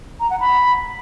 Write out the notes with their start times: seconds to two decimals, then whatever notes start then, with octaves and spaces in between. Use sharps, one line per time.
0.20 A#5
0.30 F#5
0.40 B5